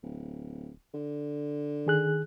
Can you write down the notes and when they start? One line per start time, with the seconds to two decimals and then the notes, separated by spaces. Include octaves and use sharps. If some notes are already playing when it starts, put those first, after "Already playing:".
0.03 D1
0.94 D3
1.87 D#3 G#4 F#6